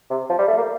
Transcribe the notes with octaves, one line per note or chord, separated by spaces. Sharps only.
C3
F3
G3
A3
A#3